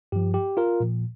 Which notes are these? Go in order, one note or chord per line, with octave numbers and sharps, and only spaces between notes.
G2 F3 G4
G4
F4 A#4
A#2 F3